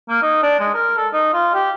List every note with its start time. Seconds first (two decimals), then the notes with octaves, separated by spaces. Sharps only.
0.09 A#3
0.22 D#4
0.43 D4
0.59 G#3
0.74 A#4
0.97 A4
1.13 D#4
1.33 F4
1.54 G4